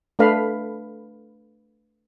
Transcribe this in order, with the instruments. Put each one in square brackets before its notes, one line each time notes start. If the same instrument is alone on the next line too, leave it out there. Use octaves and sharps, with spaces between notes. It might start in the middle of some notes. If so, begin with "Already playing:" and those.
[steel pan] A3 D4 A4 B4 F5 B5